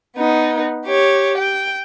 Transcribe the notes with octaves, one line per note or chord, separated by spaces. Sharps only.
B3 D#4
G4 C#5
G5